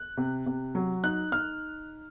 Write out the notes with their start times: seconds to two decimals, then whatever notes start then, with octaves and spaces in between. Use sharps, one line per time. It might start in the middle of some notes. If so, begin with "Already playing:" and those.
Already playing: F#6
0.17 C3
0.46 C3
0.75 F#3
1.04 D#4 F#6
1.32 D#4 F6